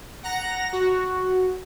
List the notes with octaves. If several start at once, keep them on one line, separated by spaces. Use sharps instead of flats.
F#5 A#5 A#6
F#4